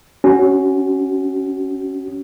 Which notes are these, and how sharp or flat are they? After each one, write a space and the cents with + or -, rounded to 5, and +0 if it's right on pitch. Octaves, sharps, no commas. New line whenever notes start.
C#4 +0 F#4 +25